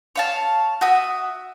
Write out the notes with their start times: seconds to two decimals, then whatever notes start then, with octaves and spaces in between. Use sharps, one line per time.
0.16 C#5 F5 A5
0.81 F#4 E5 D#6